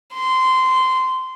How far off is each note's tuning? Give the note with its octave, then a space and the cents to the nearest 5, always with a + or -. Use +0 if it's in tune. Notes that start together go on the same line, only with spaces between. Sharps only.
C6 -15